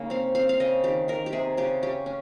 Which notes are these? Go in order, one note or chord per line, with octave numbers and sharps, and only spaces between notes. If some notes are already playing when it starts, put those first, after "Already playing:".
Already playing: C#3 A#3 D#4
C4 F5
C4 F5
F5
C#3 D#5
D#3 G4
D#3 A#4
G4
C3 G#4
C#3 G4
C#4 G4
C#4